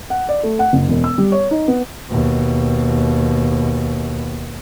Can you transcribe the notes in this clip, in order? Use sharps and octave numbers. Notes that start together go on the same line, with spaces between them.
F#5
D5
A3
F#5
F#1
E1
E6
G3
C#5
D#4
B3
D#2 B2